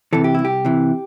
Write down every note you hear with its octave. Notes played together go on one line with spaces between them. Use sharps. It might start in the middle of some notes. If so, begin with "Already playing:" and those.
C3 E3 A4
G4
C2 E4
G4
C3 E3